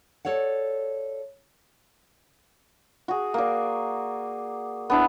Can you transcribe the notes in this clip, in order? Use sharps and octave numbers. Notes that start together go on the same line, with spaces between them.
A4 C#5 D5 F#5
F#4 G#4
A#3 D5
B3 D4 E4